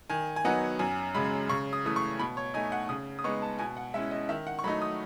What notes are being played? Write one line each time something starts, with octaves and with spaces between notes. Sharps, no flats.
D#3 G#5
G#5
F#3 B3 D#4 F#5
F#2 G#5
C#3 G#3 B5
C#3 C#6
D#6
E3 A3 D#6
C#6
B2 B5
C#5
A3 D#4 G#5
F#5
C#3 D#6
D#6
G#3 B3 D#4 C#6
A5
B2 G#5
F#5
G#3 C#4 E4 E5
D#5
D#3 E5
F#5
C#6
F#3 A3 D#4 B5
D#6